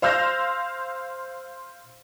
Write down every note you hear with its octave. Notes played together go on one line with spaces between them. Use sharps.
C5 F5 C6 E6 G6 A#6